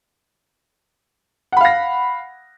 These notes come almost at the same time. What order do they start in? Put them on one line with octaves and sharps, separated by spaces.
F#5 B5 F5 A#6